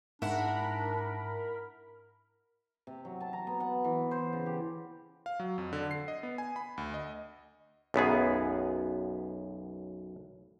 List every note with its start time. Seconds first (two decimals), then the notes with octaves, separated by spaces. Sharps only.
0.22 G#2 D4 E4 A#4 F#5 B5
2.87 C3
3.05 F#3
3.20 A5
3.33 A#5
3.47 B3
3.60 F#5
3.84 E3
4.11 C5
4.33 C#3
4.46 G4
5.26 F5
5.40 F#3
5.58 F2
5.73 D3
5.91 C7
6.08 D#5
6.23 B3
6.38 G#5
6.56 B5
6.78 D2
6.94 D#5
7.94 B1 F#2 B3 G#4